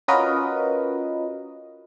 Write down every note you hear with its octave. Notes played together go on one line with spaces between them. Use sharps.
C#4 F4 F#4 A#4 B4 D#5